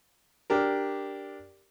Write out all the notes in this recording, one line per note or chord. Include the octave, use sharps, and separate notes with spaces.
D4 G4 A#4